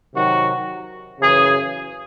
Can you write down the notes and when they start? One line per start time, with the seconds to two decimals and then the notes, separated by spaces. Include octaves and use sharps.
0.15 C3 D#3 F#3 F#4
1.21 F#2 C#3 E3 G#4